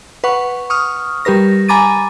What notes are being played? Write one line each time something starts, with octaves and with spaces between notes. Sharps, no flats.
B4 F#5 C#6
C#6 D#6 F6
G3 G4 A#4 B4 A#6
G#5 A#5 B5 D6 A6 D#7